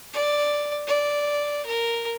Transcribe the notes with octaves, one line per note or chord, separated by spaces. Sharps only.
D5
D5
A#4